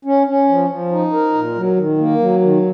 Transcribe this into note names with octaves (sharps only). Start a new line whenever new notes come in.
C#4
C#4
F3
F3
D#4
A#4
A#2
F#3
D#3
A#3
F#3
D#3